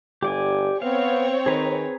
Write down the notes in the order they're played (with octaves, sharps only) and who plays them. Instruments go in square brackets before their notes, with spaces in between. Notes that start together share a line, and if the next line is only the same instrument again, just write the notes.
[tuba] G1 [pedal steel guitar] G4 D5 G#5
[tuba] B3 [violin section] C4 C#5 [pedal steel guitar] F5
[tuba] D#3 [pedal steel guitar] G#4 B4 A#5